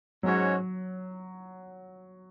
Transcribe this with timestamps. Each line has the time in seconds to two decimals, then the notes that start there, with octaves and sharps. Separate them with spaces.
0.23 G#2 F#3 G#3 C#4 F#4 C#5